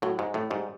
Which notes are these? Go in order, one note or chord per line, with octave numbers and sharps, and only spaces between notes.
A2 F#3
G#2 G#3
A2 A3
G#2 G3